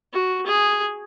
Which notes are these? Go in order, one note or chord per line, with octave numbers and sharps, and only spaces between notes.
F#4
G#4